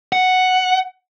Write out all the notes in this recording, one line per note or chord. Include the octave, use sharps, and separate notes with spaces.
F#5